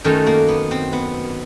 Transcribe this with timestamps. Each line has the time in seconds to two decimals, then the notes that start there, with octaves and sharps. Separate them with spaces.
0.04 F#2 D#3 F#3 A3
0.27 A#3
0.48 B3
0.71 C4
0.93 B3